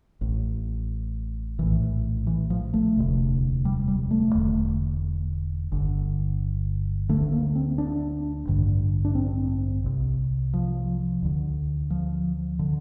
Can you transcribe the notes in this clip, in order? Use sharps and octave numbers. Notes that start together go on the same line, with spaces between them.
A1 A2
A#1 A2 E3
E3
F3
A3
E1 D2 C3
G3
G3
A3
E1 E2 D3
G1 G2 D3
D2 D3 A3
A#3
C4
D4
A1 G2 D3
D4
C4
C2 C3
F3
D2 D3
F3
D3